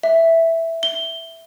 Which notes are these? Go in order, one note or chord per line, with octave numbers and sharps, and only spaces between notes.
E5
G7